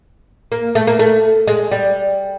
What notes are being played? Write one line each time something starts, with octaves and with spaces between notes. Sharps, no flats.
A#3
A3
A#3
A3
G#3
G3